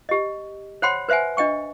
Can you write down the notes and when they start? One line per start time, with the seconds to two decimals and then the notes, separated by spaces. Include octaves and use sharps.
0.09 G4 D#5
0.82 C5 C#5 F#5 G5 B5 C6
1.09 B4 C5 E5 F#5 G#5
1.37 D4 D#5 G5 C#6